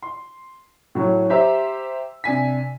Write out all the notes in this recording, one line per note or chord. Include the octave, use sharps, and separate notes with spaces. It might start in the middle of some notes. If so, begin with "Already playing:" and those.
C6
A2 F#3 C#4
G4 C5 E5 A#5 C6 E6
C3 D4 G#5 B6